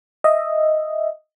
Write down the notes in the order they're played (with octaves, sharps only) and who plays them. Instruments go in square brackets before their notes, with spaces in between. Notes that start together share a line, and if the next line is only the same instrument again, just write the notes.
[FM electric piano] D#5 E5